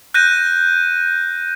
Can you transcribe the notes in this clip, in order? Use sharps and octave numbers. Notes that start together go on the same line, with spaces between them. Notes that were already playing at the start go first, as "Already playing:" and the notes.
F#6 G6 A#6 D#7